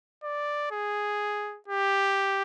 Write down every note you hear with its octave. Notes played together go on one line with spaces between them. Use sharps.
D5
G#4
G4